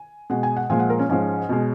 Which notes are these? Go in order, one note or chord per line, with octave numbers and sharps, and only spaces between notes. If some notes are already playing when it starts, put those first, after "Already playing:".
Already playing: G#5
B2 G#3 F#5
G#5
F#5
A#2 F3 G#3 G#5
F#5
A#4
C#4
G#2 F3 G#3 C#4
B2 G#3